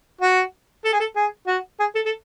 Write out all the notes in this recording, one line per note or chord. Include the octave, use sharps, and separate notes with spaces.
F#4
A4
G#4
A4
G#4
F#4
G#4
A4
A4